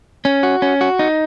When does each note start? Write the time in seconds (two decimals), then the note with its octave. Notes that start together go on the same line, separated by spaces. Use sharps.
0.25 C#4
0.43 F#4
0.62 C#4
0.81 F#4
0.99 D#4